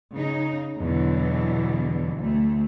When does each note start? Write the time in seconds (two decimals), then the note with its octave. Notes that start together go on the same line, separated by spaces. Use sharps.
0.14 C#3 D#4
0.78 E2 B2 D3 E3 F#3
2.15 D2 A3